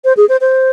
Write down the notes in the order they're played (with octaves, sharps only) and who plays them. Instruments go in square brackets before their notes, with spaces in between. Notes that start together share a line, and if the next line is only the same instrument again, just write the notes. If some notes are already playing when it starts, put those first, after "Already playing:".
[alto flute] C5
G#4
C5
C5